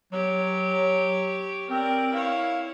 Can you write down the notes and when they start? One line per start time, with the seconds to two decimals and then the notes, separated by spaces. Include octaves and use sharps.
0.12 F#3 G4 C#5
1.69 C4 A#4 D5
2.13 E4 C#5 F5